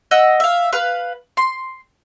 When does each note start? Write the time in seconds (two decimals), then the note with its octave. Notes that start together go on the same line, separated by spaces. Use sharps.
0.11 D#5 F#5 E6
0.40 E5 F5
0.73 B4 F5
1.37 C6